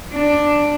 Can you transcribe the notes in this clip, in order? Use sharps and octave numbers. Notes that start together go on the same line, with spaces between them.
D4